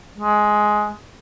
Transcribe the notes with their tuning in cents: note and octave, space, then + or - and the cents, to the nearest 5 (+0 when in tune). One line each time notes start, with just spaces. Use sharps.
G#3 +10